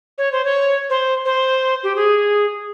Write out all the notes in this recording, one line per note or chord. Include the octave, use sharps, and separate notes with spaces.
C#5
C5
C#5
C5
C5
G4
G#4